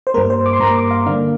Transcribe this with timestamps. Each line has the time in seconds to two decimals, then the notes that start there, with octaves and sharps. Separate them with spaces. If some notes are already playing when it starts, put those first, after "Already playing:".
0.07 C5
0.14 G2 G3 A#3 A#4
0.30 C5
0.46 D6
0.53 C6
0.60 G2 G3 A#3 A#5
0.76 D6
0.91 F5
1.06 D3 A#3 D4 F5